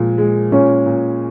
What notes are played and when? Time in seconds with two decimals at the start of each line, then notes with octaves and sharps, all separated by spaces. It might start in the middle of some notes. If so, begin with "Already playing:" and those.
Already playing: A#2 F3 G#3
0.18 G#3
0.52 A#2 C#4
0.86 A#2